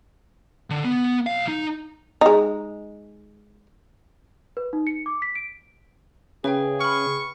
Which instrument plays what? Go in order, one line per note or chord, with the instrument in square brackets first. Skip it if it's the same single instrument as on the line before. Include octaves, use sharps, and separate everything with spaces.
[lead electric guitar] D3
B3
B1 F5
D#4
[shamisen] G#3 D#4
[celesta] B4
D#4
C#7
D6
B6
D7
[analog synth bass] C#3 [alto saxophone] G#4 [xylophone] B4 E5 G5
[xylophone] B5 F6 [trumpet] C#6